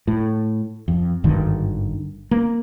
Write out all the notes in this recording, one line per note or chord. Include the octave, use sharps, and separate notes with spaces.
A2
F2
G#1 G2 D3 D#3
A#3